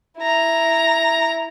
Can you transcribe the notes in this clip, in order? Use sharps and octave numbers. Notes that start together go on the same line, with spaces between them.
E4 A#5